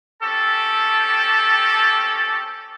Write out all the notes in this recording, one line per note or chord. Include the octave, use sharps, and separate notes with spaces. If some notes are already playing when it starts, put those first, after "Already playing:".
C4 C#4 G4 A4 A5